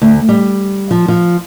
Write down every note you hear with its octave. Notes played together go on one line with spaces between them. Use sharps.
D2
G3
F3
F3